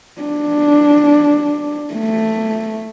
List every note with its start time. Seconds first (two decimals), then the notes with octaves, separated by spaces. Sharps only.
0.22 D4
1.94 A3